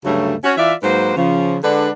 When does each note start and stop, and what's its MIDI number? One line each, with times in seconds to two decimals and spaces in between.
0.04 0.35 38
0.04 0.35 43
0.04 0.35 49
0.04 0.35 54
0.04 0.35 57
0.44 0.53 61
0.44 0.53 66
0.57 0.74 52
0.57 0.74 65
0.57 0.74 74
0.57 0.74 76
0.83 1.13 44
0.83 1.13 54
0.83 1.13 58
0.83 1.13 71
0.83 1.13 72
1.16 1.57 49
1.16 1.57 53
1.63 1.90 50
1.63 1.90 56
1.63 1.90 62
1.63 1.90 71
1.63 1.90 74
1.63 1.90 78